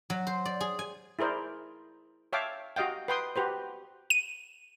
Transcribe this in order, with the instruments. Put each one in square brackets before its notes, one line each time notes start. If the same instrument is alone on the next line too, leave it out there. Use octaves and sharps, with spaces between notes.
[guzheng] F#3
C5
D5
G#4
G#5
[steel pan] E4 G#4 A#4 C5 D5
C#5 E5 F5 G5 A5 D6
F#4 G4 D#5 F5 G5
B4 G5 C6 D#6
F#4 G4 B4 C5
[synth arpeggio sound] D#7